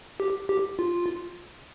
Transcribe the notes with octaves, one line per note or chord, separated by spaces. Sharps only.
G4
G4
F4